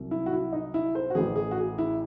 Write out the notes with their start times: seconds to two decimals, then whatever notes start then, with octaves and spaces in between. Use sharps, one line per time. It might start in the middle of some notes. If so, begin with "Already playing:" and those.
Already playing: C2 C3 F#3
0.11 E4
0.26 F#4
0.33 E4
0.53 D#4
0.74 E4
0.95 C5
1.10 F#4
1.15 A1 A2 E3 G#4
1.36 G#4
1.51 F#4
1.57 G#4
1.78 E4